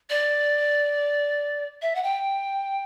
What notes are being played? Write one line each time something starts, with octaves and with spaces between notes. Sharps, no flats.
D5
E5
F#5
G5